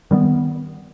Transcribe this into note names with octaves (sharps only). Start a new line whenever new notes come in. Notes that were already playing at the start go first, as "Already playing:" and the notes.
D#3 G3 A#3 B3